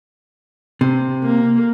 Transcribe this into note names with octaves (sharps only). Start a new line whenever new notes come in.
C3
A#3